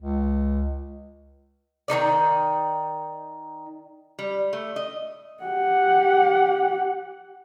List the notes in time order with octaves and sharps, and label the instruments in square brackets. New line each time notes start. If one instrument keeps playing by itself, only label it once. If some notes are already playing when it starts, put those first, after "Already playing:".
[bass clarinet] C#2
[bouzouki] D#3 A#3 D#4 D5
[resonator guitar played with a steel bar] G3
A3
D#5
[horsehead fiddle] G4 F#5